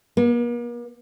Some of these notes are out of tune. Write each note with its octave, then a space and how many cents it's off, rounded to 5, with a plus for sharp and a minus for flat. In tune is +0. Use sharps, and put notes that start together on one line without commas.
A#3 +45